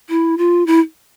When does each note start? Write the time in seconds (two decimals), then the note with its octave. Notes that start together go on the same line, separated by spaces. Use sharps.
0.09 E4
0.38 F4
0.67 E4